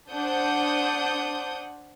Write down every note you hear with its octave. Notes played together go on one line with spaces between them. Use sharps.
D4 C5 F#5 D#6 G6